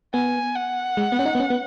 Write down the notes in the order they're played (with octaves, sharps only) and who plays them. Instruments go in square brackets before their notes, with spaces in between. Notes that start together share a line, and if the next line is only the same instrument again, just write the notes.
[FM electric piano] B3 [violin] G#5
[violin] F#5
[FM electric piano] G#3
B3
C#4
D#4
B3
C#4
B3